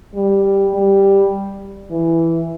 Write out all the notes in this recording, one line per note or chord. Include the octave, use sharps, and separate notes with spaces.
G3
G3
E3